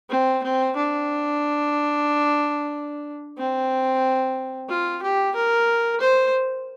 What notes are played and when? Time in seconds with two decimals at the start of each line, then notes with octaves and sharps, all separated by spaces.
0.10 C4
0.43 C4
0.76 D4
3.38 C4
4.69 F4
5.02 G4
5.36 A#4
6.01 C5